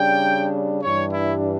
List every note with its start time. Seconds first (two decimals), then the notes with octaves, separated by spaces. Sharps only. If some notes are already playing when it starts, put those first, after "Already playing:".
Already playing: C#3 G3 D4 G5
0.83 G2 E3 G3 D4 C#5
1.12 E4